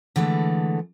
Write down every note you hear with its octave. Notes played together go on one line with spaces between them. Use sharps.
D3 E3 G#3 A3